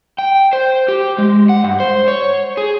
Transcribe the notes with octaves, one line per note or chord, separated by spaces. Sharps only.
G5
C5
G4
G#3
F#5
G2
C5
C#5
G#4